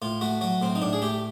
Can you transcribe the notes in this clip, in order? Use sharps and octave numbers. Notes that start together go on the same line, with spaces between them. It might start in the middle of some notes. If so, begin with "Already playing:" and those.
A2 F4
A3 F#4
F#3 F#4
A2 C4
D#4
A2 D4
G#4
A3 G4